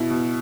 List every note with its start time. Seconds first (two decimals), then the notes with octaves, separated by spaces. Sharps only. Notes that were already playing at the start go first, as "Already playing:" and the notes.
Already playing: B2 E4
0.10 B2